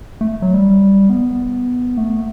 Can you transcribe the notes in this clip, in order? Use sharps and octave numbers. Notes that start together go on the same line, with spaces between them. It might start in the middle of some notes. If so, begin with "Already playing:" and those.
A3
F#3
G3
B3
A3